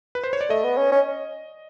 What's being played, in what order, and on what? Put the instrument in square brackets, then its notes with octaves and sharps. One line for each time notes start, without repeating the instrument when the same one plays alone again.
[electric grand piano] B4
C5
C#5
D5
[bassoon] A3 [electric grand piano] D#5
[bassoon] B3
C#4
C#4